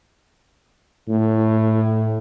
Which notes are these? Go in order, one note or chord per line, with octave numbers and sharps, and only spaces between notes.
A2